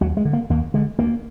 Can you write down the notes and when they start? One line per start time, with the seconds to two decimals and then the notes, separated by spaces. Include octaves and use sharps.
0.01 D#2 F#3
0.17 G#3
0.25 D3
0.33 A#3
0.50 D#2 A#3
0.74 D3 G#3
0.99 D2 A#3